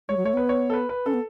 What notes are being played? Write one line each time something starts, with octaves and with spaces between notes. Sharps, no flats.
G#3 C#5
F#3
A3 C#5
B3 B4
C#5
A4
B4
B4
C#4 A4
B3